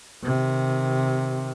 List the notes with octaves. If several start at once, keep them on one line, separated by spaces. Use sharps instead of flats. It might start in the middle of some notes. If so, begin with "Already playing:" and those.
C3 D#3